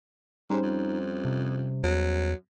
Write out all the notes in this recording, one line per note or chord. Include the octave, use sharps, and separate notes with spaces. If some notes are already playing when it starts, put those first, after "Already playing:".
G#2 G3 C#4 D#4 C5
F2
C3
E2 F#3